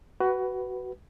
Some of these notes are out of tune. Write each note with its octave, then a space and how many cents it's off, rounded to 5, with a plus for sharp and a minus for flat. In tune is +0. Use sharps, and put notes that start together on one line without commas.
F#4 +20 B4 +0